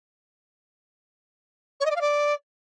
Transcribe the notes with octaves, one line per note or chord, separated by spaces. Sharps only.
C#5
D#5
D5
F5
D5